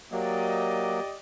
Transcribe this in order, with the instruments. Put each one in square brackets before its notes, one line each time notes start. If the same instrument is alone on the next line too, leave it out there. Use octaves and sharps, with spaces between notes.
[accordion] F#3 A#3 [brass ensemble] G4 D5 D#5